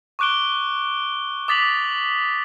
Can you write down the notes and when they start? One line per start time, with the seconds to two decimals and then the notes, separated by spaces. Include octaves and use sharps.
0.19 C#6 D6 F#6 D7 G7
1.48 D6 D#6 A6 B6 F7 F#7